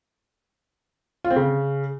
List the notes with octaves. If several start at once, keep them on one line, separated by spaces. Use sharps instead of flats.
F4
C4
C#3